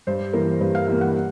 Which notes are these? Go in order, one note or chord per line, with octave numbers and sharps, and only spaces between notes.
G2 C5
E3 G3 A#3 A#4
G2 B4
F5
E3 G3 A#3 F5
F#5